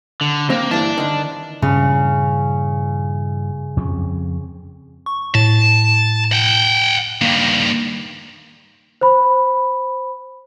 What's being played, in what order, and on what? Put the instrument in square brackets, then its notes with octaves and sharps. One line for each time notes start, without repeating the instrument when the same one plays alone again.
[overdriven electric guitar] D3
[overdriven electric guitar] A#3 [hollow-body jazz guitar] C4
[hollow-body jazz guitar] G2 E3 [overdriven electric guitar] D5 A5
[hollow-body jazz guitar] D3 D#3
[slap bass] G2 A#2 E3 [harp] C#3
[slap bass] F2 C4 C#4
[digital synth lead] C#6
[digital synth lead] A2 [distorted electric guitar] A5
[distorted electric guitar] F#5 G5
[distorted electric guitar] G2 D#3 [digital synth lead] A#3
[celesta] C5 B5